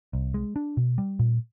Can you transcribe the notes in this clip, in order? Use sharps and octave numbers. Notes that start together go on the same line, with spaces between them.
C2
G#3
D4
B2
G3
A#2